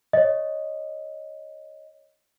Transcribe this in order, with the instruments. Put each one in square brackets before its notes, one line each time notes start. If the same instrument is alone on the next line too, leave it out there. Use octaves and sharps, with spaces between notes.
[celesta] C#5 D#5